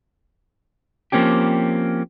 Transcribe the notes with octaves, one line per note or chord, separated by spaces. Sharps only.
F3 A#3 C4 C#4 G4